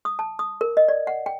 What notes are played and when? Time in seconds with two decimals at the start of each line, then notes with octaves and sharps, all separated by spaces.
0.05 D#6
0.19 A5
0.39 D#6
0.61 A#4
0.77 D#5
0.88 D5
1.07 F#5
1.26 G5